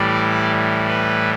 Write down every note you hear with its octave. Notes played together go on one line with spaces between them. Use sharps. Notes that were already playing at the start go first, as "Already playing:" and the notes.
Already playing: A2 E3 G3 D5
B4